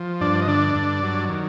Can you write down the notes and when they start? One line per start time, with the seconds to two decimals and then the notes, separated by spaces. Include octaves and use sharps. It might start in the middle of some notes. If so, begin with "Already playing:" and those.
Already playing: F3
0.21 G2 D4 D5
0.42 D#5
0.47 D3 D4 D5
0.76 G2
1.03 F#3
1.29 D#3